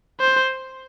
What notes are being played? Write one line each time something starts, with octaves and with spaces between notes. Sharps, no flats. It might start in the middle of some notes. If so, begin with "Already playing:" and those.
C5